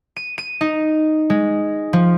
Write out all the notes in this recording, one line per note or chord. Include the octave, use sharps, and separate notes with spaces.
D#7
D#7
D#4
G#3
F3